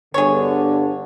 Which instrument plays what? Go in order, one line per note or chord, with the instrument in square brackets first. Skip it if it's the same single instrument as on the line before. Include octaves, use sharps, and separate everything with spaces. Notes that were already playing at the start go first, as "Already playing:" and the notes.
[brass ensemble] G1 D3 [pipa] G#4 C#5